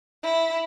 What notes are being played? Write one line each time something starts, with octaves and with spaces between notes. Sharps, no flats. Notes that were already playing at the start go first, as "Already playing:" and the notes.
E4